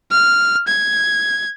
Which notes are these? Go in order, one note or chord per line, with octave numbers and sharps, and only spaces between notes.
F6
G#6